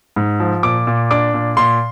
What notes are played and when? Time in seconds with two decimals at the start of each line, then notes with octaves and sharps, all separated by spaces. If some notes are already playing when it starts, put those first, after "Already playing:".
0.16 G#2
0.40 F3
0.63 A#2 D6
0.87 A#2
1.11 D4 D6
1.34 A#2
1.57 A#2 C6